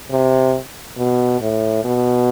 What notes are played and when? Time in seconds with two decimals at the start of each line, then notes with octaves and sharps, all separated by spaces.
0.10 C3
0.97 B2
1.41 A2
1.84 B2